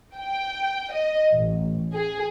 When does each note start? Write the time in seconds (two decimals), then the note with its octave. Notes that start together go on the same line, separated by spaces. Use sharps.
0.16 G5
0.92 D#5
1.34 A1
1.94 G#4